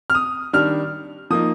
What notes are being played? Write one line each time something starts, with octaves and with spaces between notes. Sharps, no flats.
F6
D#6
D#3 G3 D4 F6
F3 A#3 D#4 D#6